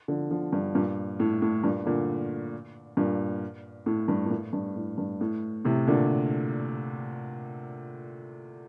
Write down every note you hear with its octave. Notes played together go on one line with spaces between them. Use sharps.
D3 F3
D3 F3
G2
G2 A#2
A2
A2
G2 A#2
A#2 D3
G2 A#2
A2
G2
A#2
A2
G2
A2
G2
A2
A2 C3
A#2 D3